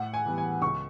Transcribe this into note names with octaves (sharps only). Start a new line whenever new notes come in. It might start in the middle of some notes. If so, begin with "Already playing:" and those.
Already playing: A2 F#5
G#5
E3 G3 B3
G#5
C#2 C#6